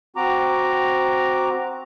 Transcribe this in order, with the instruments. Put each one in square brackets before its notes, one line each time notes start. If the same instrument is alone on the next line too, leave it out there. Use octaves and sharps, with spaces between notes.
[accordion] C4 F#4 A#5 D6